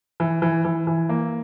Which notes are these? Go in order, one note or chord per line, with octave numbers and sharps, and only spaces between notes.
E3
E3
E3
E3
A#3